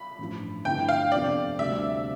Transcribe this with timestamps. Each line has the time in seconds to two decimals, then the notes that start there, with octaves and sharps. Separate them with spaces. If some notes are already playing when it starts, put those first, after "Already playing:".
Already playing: B5
0.18 A1 G2 F3
0.65 G2 D3 A3 C4 E4 G5
0.89 F5
1.12 F2 C3 F3 B3 D4 D5
1.58 D2 C3 G3 C4 E5